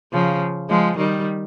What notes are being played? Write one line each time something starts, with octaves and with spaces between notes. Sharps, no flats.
C#3 F3
F3 G#3
D#3 G3